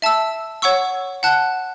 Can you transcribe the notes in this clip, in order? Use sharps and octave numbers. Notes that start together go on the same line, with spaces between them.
E5 A5 E6
C#5 F#5 C#6 E6
F#5 A5 F#6